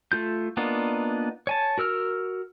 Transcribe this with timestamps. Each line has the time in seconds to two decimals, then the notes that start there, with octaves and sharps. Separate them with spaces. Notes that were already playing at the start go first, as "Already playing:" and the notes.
0.12 A3 F4 G6
0.57 A#3 B3 D4 D#4 F4
1.47 C#5 G#5 A5
1.78 F#4 A#4 E6 F6